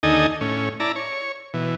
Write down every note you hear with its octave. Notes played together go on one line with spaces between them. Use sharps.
D#2 D3 D#4 A4 D#5 G#5
A2 C#4
E4 D5 A5 A#5
C#5
B2 E3